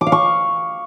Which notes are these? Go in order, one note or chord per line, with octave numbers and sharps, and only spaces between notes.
D6
F5
C#6